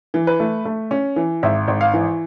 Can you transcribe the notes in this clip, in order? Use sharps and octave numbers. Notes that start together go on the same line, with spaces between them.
E3
B4
A3
A3
C#4
E3
G#1 E5
G#1
F5
E3